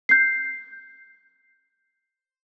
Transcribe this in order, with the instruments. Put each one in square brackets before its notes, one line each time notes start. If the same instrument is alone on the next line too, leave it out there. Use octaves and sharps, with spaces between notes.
[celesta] G6 C7